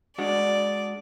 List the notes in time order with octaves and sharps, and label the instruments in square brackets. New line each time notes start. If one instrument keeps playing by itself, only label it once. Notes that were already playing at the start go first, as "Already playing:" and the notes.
[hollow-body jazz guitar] G#3 D4 F#4 [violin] D5